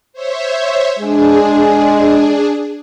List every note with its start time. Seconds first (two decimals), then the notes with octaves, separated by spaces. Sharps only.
0.13 C5 C#5 E5
0.99 G#3 D4 G#4